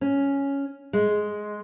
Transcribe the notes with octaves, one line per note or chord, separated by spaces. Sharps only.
C#4
G#3